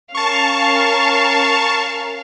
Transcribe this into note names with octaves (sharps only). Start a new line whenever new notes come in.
C#4 A#4 F5 A5 C#6